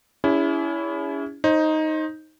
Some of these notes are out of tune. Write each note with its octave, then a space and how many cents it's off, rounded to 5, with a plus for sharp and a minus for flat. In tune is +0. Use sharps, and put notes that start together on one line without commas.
C#4 +35 E4 +0 G#4 -35
D#4 +5 C5 +30